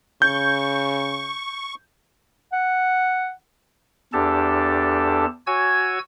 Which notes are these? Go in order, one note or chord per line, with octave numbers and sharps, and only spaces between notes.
C#3 C#6 G6
F#5
E2 D4 G4 A4 A5
F#4 C#5 G#5 E6 G#6